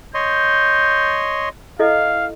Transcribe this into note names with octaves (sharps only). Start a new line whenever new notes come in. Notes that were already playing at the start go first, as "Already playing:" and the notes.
C#5 D#5 C6 G6
E4 A4 D#5 F5